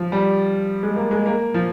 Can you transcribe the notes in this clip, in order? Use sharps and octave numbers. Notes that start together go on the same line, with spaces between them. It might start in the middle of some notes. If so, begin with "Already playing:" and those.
Already playing: F3
G3
G#3
A#3
G#3
A#3
F3